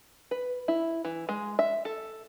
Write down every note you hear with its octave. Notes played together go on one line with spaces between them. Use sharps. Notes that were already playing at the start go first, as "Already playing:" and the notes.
B4
E4
E3
G#3
E5
A4